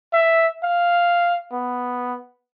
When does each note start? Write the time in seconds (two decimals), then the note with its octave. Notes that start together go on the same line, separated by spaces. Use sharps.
0.13 E5
0.64 F5
1.52 B3